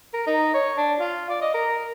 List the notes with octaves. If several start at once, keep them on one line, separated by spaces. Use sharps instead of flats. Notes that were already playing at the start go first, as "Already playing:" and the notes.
A#4
D#4
C#5
D4
F4
D5
D#5
A#4